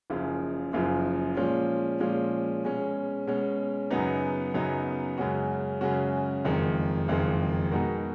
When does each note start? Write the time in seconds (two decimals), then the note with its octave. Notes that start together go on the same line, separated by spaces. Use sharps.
0.10 F#1 F#2 C#3 F3
0.73 F#1 F#2 C#3 F3
1.37 A#2 F3 G#3 C#4
2.00 A#2 F3 G#3 C#4
2.64 B2 G#3 C#4
3.27 B2 G#3 C#4
3.90 F#2 C#3 F#3 B3 D#4
4.54 F#2 C#3 F#3 B3 D#4
5.18 F#2 C#3 G#3 C#4 F#4
5.81 F#2 C#3 G#3 C#4 F#4
6.44 F#1 F2 D#3 G#3
7.08 F#1 F2 D#3 G#3
7.71 B2 G#3 D#4 F#4 A#4